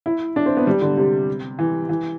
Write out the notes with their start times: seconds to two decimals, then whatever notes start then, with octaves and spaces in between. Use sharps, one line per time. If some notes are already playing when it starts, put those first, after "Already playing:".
0.06 E4
0.36 D4
0.46 C4
0.57 B3
0.67 G3
0.81 D3
0.97 C3
1.59 E3
1.89 E3